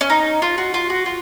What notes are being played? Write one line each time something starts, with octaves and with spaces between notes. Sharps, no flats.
C#4
D#4
F4
F#4
F4
F#4
F4